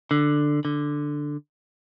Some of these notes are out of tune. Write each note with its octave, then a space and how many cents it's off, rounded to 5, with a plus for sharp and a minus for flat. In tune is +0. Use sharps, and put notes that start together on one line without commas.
D3 +10
D3 +5